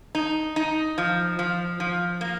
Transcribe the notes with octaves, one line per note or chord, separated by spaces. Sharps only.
D#4
D#4
F3
F3
F3
A#3